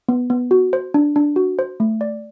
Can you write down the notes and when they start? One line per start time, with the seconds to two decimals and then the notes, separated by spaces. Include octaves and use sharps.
0.09 B3
0.30 B3
0.51 F#4
0.73 C5
0.94 D4
1.16 D4
1.36 F#4
1.59 C5
1.80 A3
2.01 D5